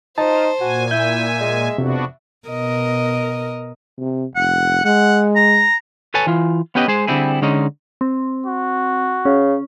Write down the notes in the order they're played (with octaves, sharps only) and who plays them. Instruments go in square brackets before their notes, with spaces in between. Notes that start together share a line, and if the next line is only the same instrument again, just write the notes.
[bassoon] D#4 [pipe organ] F4 [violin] C5 [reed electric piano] A5
[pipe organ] A#2 G#5 [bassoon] F#4
[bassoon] E4 [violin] E5 [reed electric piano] G6
[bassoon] G#3
[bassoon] F2 [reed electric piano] C3 [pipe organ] B3 D4 F#4
[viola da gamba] B2 A#4 D#5
[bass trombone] C3
[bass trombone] F1 [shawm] F#5
[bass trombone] G#3 [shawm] F#5
[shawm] A#5
[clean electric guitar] A4 B4 C#5 G#5 A5
E3 F4
B3 C#4 G4 B4 D#5
G#3 G#4 C5
D3 G3 C4 E4 G#4
D3 G#3 C#4 D#4
[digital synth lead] C4
[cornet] F#4
[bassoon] C#3 [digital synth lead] C#4